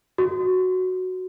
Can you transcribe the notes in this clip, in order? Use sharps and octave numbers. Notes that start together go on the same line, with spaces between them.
F#4